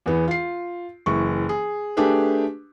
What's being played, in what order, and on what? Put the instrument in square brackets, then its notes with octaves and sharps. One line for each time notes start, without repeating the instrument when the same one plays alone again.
[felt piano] E2 E3 B3
F4 C7
F#1 E3 C#6
G#4
A3 D4 G4 G#4 B4